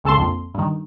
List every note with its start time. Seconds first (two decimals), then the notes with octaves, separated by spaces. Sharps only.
0.04 C#2 C#3 A4 A5 C6
0.17 A#1 F2
0.54 G2 D#3